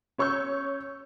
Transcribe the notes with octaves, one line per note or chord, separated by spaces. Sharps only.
C#4 C#5 C#6 E6 G6